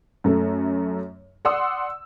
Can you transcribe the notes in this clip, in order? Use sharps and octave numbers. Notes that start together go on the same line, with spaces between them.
F#2 A3
D5 F#5 C6 D#6 E6